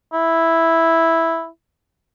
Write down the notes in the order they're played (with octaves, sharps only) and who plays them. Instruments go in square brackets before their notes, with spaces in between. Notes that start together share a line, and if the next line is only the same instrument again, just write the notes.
[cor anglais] E4